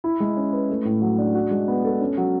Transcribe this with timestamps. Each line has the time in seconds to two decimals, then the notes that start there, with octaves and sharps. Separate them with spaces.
0.04 E4
0.20 G#3
0.37 C#4
0.53 B4
0.69 A3
0.85 A2
1.02 F#3
1.18 D4
1.34 F#4
1.51 G#3
1.68 B3
1.85 A4
2.01 C#4
2.17 F#3